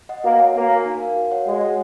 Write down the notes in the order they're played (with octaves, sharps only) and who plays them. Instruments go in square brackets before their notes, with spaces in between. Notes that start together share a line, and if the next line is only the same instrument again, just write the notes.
[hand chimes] D#5 F#5
[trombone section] A#3 [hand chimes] F#4
[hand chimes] C#5 G#5
[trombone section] A#3 [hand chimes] F#4
[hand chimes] A#4 F5 G#5
D#4
A#4 F5
F#4
C#5 F#5
[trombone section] G#3 [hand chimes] F#4
[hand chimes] C#5 F#5